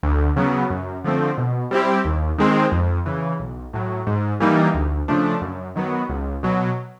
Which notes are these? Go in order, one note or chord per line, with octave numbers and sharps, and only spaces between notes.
D2
C#3 F#3 B3
F#2
D3 F3 A3 C4
B2
G3 C4 E4 G4
D#2
D#3 G#3 C4
F2
C#3 E3
B1
A2 F#3
G#2
E3 G3 A#3 D#4
D2
C#3 F3 A3 D4
F#2
D#3 F#3 B3
C#2
B2 F#3